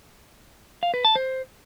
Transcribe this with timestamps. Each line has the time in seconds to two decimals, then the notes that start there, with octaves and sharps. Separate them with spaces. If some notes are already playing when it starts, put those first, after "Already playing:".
0.83 F5
0.94 B4
1.05 A5
1.16 C5